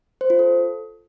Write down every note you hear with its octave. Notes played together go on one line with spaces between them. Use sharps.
C5
F4
A4